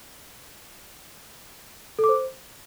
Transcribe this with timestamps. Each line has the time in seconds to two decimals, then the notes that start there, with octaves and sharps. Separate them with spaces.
1.99 A4
2.04 D6
2.09 C5